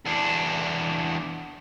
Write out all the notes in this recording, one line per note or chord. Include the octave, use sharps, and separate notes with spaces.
E2 D4